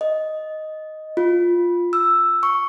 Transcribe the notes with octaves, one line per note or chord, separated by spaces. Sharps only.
D#5
F4
E6
C#6